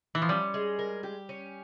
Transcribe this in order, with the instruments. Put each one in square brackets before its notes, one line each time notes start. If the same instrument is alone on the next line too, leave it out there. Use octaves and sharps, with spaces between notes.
[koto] E3
F3
[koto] G3 [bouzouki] C#4
[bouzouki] G#3
A#4
G4
C#4